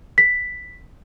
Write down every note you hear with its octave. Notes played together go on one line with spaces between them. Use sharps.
B6